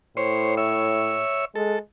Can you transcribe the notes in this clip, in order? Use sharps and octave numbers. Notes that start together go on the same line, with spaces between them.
A2 C5 C#5
C#5 E5
G#3 A4